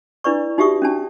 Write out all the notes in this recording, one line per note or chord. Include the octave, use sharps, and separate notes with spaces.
D4 E4 B4 D5 C#6
D#4 F#4 G4 E5 C#6 D#6
C#4 D4 A5